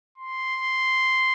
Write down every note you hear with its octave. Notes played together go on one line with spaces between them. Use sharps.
C6